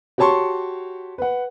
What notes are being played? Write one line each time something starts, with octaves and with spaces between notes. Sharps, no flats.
F#4 G4 C#5 A5 C6 C#6
B4 F#5